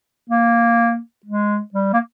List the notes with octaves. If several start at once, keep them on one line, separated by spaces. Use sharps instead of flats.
A#3
G#3
G3
A#3